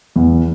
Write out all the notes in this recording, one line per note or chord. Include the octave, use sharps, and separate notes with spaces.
E2